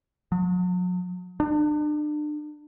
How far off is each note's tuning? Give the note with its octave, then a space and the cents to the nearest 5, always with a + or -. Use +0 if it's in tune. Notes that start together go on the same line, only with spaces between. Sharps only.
F#3 -40
D4 +35